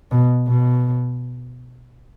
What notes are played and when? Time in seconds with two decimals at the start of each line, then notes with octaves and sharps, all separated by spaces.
0.11 B2
0.48 B2